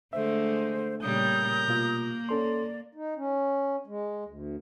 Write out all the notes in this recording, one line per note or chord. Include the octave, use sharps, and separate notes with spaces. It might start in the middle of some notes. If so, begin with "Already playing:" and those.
D3 G#3 A3 C5 E5
A#2 C#3 G3 A#4 A#5 D#6 G6
B2 A#3 F4
C#4 A4 D5 C6
D#4
C#4
G#3
D2